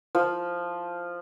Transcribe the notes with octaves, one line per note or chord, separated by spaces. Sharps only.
F3